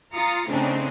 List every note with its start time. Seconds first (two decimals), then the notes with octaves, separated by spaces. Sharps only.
0.15 F4 A#5 D#6 A6 C#7
0.49 A2 C#3 C4 D4 D#4